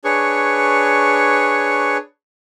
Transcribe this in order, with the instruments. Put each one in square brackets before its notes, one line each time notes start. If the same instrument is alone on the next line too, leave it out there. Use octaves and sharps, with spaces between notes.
[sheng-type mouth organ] D4 G#4 B4 C#5 C#6